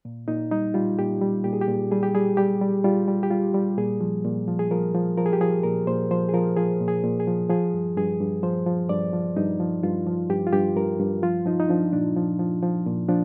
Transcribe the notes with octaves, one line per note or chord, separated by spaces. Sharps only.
A#2
A#2 D#4
G3 D#4
G3 F4
A#2 G4
G3
A#2 G4
G#4
G4
A#2
G3 G#4
G4
G3 G#4
G3 G4
G3
G3 F4
G3
G4
G3 F4
G3
A#2 G#4
F3
A#2
F3
G#4
F3 A#4
F3
F3 A#4
G#4
G4
F3 G#4
A#2 A#4
A#2 C5
F3 C5
G#4
F3 A#4
F3 G#4
A#2
G#4
A#2
G#4
F3
F3 G#4
G2
G2 G#4
G2
F3 C5
F3
G2 D5
F3
G2 D#4
F3
G2 F4
F3
G2 G4
F4
G2 G4
G2 A#4
G2
F3 F4
F3 D#4
D#4
F3 D4
A#2 D4
F3
F3
F3
A#2
F3 D4